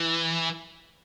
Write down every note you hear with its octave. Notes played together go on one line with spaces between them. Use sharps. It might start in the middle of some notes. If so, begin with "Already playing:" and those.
Already playing: E3